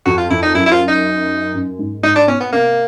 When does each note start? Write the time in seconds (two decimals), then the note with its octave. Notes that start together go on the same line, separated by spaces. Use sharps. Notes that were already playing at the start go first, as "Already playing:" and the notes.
0.06 F2 F#4
0.18 F4
0.30 F2 E4
0.43 D#4
0.55 F#2 E4
0.66 E4
0.72 F4
0.88 D#4
1.54 F#2
1.79 G#2
2.03 G#2 D#4
2.16 D4
2.27 B2 C#4
2.40 B3
2.53 C3 A#3